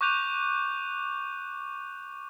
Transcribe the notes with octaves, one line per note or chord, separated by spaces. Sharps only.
C#6 D6 F#6 G6 D#7 F7